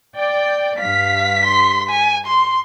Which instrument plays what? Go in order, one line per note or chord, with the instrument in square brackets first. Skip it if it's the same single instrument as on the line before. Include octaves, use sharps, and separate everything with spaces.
[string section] D5 G5
[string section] G2 B6 [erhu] F5
[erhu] C6
G#5
C6